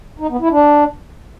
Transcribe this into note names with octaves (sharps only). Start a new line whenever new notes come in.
D#4
B3
E4
D4